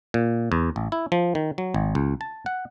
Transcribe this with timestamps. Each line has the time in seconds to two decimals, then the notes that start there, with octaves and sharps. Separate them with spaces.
0.14 A#2
0.52 E2
0.76 A1
0.92 E4
1.12 F3
1.35 D#3
1.58 F#3
1.74 G#1
1.95 C#2
2.21 A5
2.46 F#5